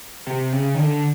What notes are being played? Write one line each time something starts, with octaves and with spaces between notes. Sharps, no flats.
C3
C#3
D#3
D3